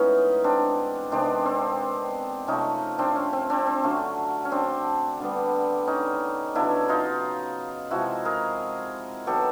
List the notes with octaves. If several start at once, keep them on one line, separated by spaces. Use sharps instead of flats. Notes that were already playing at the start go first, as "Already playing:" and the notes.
Already playing: A2 E3 G#3 B3 C#4 D#4
C4 D4
C3 D#3 G#3 B3 C4 D4
C4
C3 F3 A3 C#4 D#4
C4 D4
C#4
C4
C4 D4
C4
D3 F#3 A3 C#4
C#4
C4 D4
D3 G3 B3
C#4 D#4
C#3 F#3 B3 D4 E4
D#4 F4
C3 F3 G#3 E4 F#4
G#4 A#4
D#3 F#3 B3 G4 A4